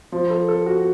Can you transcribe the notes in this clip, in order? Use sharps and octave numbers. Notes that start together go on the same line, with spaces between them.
F3
A4
A4
F#4